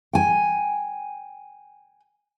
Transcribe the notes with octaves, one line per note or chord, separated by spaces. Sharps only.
G5 G#5